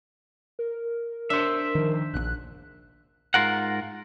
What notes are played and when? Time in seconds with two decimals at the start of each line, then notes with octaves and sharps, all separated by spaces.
0.59 A#4
1.30 D4 C5 E5
1.75 D#3 F3
2.14 E1 A#1 F#6
3.34 G#2 F4 A#4 F#5